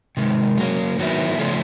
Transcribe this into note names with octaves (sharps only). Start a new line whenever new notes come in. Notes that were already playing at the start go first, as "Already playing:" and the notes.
C3 D#3 G#3
F#3 A#3 C#4
D#3 F#3 B3 E4
C#3 F3 A3 C#4